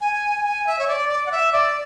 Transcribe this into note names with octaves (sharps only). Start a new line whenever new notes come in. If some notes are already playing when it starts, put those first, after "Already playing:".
G#5
G#5
E5
C#5
D5
D5
F#5
E5
D5